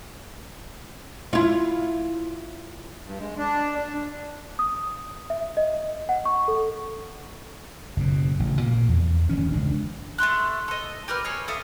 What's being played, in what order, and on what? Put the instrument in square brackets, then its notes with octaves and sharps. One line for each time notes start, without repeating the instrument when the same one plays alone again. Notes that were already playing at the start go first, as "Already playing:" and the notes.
[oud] E4 F4
[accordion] G2
G#3
D4
D4
[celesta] D#6
E5
D#5
F#5
C#6
A4
[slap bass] F#1 B2
A1 C#3
A#2 A#3
E2
D1 D2 E3 C#4
G#1 C#2 D4
[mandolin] A3 E5 C6 F#6
A4 D#5
G4 A#4 B4 F6
G#4 A4 C#5
A4 E5 F5 D#6